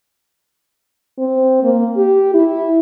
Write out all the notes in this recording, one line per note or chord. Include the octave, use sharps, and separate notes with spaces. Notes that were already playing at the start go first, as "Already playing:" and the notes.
C4
A#3
G4
E4